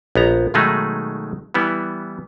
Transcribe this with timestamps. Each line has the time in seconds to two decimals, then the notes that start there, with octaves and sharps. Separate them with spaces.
0.15 A#1 B3 A#5
0.54 B2 D#3 F#3 G#3 A3 D#4
1.54 E3 G3 B3 E4